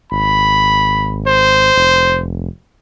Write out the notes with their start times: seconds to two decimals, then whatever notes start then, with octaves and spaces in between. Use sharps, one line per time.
0.12 G#1 B5
1.27 C5
1.77 F1